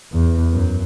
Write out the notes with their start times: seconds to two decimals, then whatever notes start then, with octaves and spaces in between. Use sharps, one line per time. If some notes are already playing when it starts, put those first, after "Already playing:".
0.12 E2
0.53 F#2